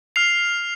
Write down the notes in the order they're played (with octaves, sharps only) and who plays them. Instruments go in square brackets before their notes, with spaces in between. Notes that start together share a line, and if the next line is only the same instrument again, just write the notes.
[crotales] F6 C7 F7